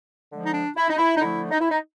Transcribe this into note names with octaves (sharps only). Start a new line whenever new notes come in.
D3 F3 G#3
D#4
D4
E4
D#4
E4
D#4
D3 F3 A3 E4
D#4
E4
D#4